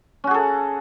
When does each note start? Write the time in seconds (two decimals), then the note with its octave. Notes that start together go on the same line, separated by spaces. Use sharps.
0.24 C#4
0.27 F#4
0.31 G#4
0.34 A4